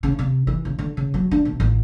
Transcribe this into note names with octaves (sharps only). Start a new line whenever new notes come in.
C#3
C3
E3
C#3
D3
C#3
F#3
D4
B1
A1